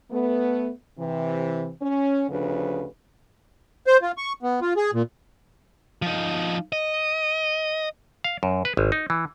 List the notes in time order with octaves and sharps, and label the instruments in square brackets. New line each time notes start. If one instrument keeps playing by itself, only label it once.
[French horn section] A3 B3
C3 E3
C#4
D2 C#3 F3 D4 B4
[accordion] C5
F4
C#6
B3
F4
G#4
A#2
[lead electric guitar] F3 D#4
D#5
[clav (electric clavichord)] F5
F#2
B4
G#1
D#4
E3